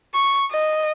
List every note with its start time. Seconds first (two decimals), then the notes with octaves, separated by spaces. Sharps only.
0.14 C#6
0.51 D#5